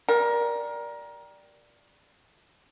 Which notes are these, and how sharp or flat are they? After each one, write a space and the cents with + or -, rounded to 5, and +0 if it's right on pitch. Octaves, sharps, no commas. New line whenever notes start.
G3 +0 A#4 +20